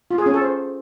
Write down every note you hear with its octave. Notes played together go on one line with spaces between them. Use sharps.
F4
G#4
C#4
A4
C5